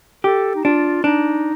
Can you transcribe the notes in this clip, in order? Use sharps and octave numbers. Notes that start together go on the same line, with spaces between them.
G4 A4
D#4
D4 F4
D4 D#4